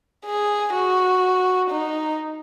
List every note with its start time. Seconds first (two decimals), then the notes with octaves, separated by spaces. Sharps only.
0.25 G#4
0.74 F#4
1.71 D#4